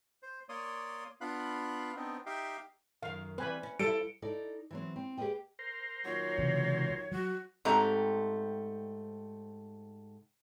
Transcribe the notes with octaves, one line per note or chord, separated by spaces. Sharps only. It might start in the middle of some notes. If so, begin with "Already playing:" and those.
C5
A#3 C#5 D5 C6 D#6
B3 D4 F4 F5 B5 F#6
B3 C4 D4 D#4
D#4 G4 E5 F5 G5
F#2 D#3 F5
E3 G3 C4 B4 G#5 B5
C#4
F3 G3 E4 A4 C#7 D7
D#4 E4 A4 D5
E3 F#3 C4
C4
G4 G#4 A#4 B4 D#5 G5
A#4 C5
A#2 D#3 F#3 C#5
C#2 C3 E3
F#3 F#4
G#2 A3 C4 G4 D5 A#5